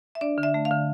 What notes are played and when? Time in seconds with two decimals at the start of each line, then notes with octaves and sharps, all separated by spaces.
0.15 E5
0.21 D4 D5
0.38 D3
0.43 E5
0.54 A3
0.65 F5
0.71 D3